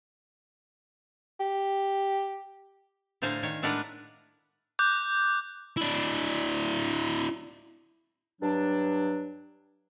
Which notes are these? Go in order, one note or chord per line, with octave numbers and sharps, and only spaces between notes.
G4
A2 D3 C5 F5 G#5 A#5
D#3 C#5
A2 G#3 D4 A#4 B4 F#5
D6 F#6 G6
D4 E4
G2 F#3 D4